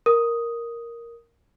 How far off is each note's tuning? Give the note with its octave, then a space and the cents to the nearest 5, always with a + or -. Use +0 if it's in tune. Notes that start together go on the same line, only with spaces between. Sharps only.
A#4 +0 D#6 +0